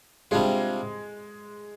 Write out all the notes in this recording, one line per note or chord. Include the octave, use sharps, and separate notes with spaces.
C3 G3 G#3 D4 F4